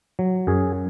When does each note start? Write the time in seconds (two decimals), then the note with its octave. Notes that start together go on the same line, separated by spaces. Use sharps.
0.19 F#3
0.47 F#2 G#4